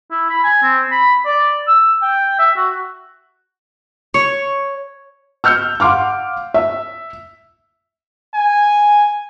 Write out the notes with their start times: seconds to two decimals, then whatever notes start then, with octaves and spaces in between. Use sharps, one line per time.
0.11 E4
0.30 B5
0.43 G#5
0.63 C4
0.91 B5
1.26 D5
1.67 E6
2.02 G5
2.39 E5
2.57 F#4
4.14 C#5
5.44 E6 F6 G6 C#7
5.80 F5 F#5 C6 D6 F6
6.54 E5
8.34 G#5